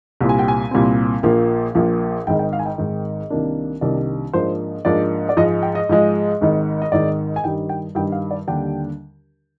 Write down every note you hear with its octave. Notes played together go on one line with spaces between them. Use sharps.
C2 A#2 G3 C4
G#5
G5
G#5
C2 A#2 G3 C4
A#1 A#2 F3 A#3
A#1 A#2 F3 A#3
G#1 G#2 D#3 G5
G5
F5
G#5
G5
G#1 G#2 D#3
C2 C3 D#3 A#3 D4
C2 C3 D#3 A#3 D4 D5
G#2 F3 A#3 D4 C5
G#2 F3 A#3 D4 D5
D5
G#2 F3 G#3 D#5
G5
D#5
G#2 F3 G#3
G#1 G#2 D#3
D#5
G#1 G#2 D#3 D5
G#5
G2 D#3 G3 G5
G5
G2 D#3 G3 G5
F5
D5
D#2 D3 G3 D4 G5